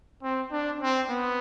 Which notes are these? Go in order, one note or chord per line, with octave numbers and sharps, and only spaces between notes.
C4
D4
C4
B3